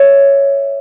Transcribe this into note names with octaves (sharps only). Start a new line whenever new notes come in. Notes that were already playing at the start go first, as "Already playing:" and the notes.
Already playing: C#5 E5